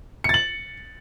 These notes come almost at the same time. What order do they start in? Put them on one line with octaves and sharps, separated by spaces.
C#7 A6 F#7